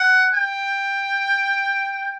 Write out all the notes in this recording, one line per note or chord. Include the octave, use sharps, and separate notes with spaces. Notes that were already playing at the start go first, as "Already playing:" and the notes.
Already playing: F#5
G5